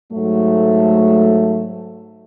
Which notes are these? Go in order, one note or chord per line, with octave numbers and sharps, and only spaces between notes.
G#2 F#3 A3